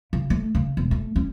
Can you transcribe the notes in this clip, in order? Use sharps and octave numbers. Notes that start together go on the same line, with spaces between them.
C#3
A3
C#3
E1
A3
C#4